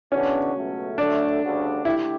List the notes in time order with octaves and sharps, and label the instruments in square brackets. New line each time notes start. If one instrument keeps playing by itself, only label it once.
[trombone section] C#3 E3 B3 D4 F#4 [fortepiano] C#4
[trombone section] C#2 B2 F#3 A3
[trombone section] D3 F#3 A3 [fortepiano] D4
[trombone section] D2 C#3 G3 D4 F#4
[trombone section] D3 A3 D4 G4 [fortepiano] E4